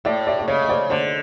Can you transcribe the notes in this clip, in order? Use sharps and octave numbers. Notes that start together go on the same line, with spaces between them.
A2 D5 E5
D5 E5
D5
C#3 C#5 D#5
D#5
C5 D5
D3 C5 D5